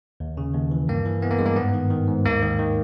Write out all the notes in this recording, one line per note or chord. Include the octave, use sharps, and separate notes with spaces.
D#2
C#3
D#2
E3
G2 A#3
E3
E3 B3
A#3
G2 G#3
A#3
G#2 B3
D#3
D#3
G#2
D#2 A#3
D#3
D#3